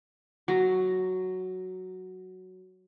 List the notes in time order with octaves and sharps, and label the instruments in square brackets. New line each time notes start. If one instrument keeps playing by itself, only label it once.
[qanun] F#3 A#5